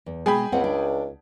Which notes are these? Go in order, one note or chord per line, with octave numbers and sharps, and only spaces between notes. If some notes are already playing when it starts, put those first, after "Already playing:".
E2
B2 G#3 G#4 G5 B5
C#2 C4 B4 F#5
D4